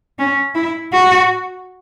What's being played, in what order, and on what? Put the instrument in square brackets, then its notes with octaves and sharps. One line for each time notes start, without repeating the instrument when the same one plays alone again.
[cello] C#4
E4
F#4